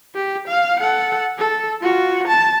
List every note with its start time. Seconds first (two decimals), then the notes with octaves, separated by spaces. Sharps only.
0.15 G4
0.47 F5
0.79 A4 F#5
1.39 A4
1.82 F4 F#4
2.27 A5